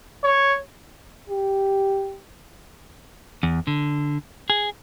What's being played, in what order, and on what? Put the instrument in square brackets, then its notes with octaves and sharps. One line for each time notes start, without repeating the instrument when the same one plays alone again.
[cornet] C#5
[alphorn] G4
[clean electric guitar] E2
D3
G#4